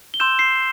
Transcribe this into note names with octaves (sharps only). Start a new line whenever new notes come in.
G7
C6 E6 G6 E7
C7